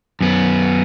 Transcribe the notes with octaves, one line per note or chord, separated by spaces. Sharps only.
F#2 B3